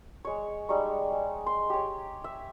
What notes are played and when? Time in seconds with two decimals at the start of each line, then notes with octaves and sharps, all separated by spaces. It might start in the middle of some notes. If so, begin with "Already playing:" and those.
0.25 G#3 C#5
0.69 G3 G#3 D#4 C#6
1.12 G#3
1.46 C6
1.70 G4 C#5
2.24 E5